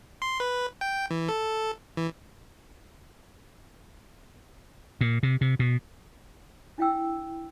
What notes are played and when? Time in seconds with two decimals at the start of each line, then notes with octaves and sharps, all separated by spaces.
0.22 C6
0.40 B4
0.81 G5
1.10 E3
1.29 A4
1.97 E3
5.01 A#2
5.23 C3
5.41 C3
5.59 B2
6.78 D4 E4 F5 G5 E6